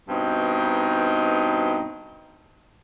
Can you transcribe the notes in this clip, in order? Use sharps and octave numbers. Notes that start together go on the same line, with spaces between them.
G2 B2 C4 D#4